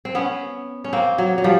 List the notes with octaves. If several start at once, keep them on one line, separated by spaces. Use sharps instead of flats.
C4
B3 C#4
C#4
A#3 C4
F#3
F#3
F3 G3